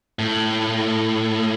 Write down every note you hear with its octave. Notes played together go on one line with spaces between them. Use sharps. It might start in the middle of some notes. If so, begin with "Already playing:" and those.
A2